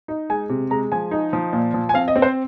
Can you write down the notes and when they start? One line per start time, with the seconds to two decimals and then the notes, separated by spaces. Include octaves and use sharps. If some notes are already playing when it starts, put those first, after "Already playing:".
0.08 D#4
0.30 G#3 G#5
0.49 C3
0.70 G#3 A#5
0.92 F3 G#5
1.11 D#4
1.33 F3
1.53 A#2
1.74 F3
1.89 G#5
1.94 C4 F5
2.08 D#5
2.16 C4
2.22 C5